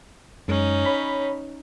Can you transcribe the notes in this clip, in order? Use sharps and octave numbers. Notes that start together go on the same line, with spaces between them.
F#2 G#3 C#4 D#4
C#5 B5 B6